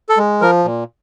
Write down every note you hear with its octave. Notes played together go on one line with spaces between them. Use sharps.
A4
G#3
F3 A#4
A#2